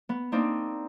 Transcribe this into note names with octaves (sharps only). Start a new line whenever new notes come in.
B3
A#3 C4 D4 D#4